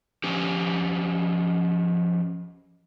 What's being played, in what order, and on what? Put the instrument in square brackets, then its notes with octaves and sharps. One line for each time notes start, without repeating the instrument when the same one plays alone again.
[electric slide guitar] F3 C#4 G4